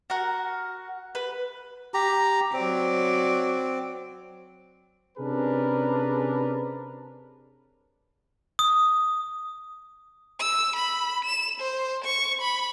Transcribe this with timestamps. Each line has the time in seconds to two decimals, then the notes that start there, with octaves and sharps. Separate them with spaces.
0.10 F#4 A#4 F#5
1.15 B4
1.94 G4 A#5
2.53 F#3 C4 D5
5.18 C3 C#4 D4 G#4 A#4 B4
8.59 D#6
10.39 E6
10.76 B5
11.24 E7
11.60 C5
12.04 C#6
12.41 B5